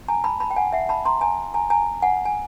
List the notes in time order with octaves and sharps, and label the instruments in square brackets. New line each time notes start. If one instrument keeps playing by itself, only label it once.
[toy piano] G#5 A#5
A5 B5
A5 B5
G5
F#5 G#5
E5 F#5
A5 B5
A#5 C6
G#5 A#5
G#5 A#5
G#5 A#5
F#5 G#5
G#5